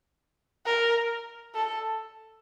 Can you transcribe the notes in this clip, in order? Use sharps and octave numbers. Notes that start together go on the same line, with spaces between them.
A#4
A4